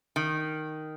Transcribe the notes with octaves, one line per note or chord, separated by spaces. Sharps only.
D#3